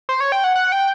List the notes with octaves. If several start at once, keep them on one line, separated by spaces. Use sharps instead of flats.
C5
C#5
G5
F#5
F#5
G5